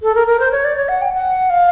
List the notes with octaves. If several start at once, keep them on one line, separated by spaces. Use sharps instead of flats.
A4
A#4
A#4
C5
C#5
D5
C#5
F#5
G5
F#5
F5